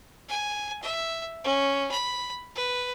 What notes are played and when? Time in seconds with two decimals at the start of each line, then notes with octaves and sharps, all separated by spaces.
0.28 G#5
0.82 E5
1.44 C#4
1.91 B5
2.56 B4